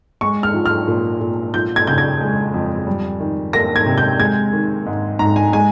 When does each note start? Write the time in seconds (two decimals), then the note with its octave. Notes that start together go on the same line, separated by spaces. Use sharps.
0.21 G#3 C#6
0.43 F6
0.54 F3
0.66 F6
0.88 A#2
1.21 A#2
1.54 F3 G6
1.76 G#6
1.87 C#3 G6
1.98 G#6
2.21 G#3
2.54 F2
2.87 G3
3.20 D#3
3.53 A#3 A#6
3.76 G#6
3.86 C3
3.98 G6
4.19 G#3 G#6
4.53 D#3
4.86 G#2
5.19 G#2 A#5
5.36 G#5
5.53 G#3 G#5